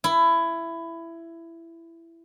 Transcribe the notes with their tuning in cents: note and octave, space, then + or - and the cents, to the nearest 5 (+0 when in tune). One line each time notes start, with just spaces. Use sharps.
E4 +15